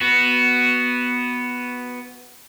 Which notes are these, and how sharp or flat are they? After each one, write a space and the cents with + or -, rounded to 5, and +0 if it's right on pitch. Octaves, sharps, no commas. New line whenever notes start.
B3 +0 F#4 +5